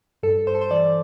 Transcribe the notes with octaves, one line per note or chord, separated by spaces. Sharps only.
G2 A4
G2 C5
A4
C5
E3 D5